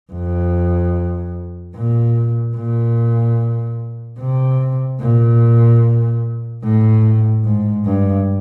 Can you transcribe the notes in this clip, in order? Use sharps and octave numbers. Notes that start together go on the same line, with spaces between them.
F2
A#2
A#2
C3
A#2
A2
G#2
G2